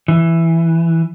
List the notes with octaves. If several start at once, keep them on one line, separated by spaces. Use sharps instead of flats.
E3